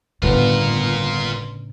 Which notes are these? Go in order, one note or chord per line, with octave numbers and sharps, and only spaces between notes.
G1 A2 C#3 B3 F4 A#4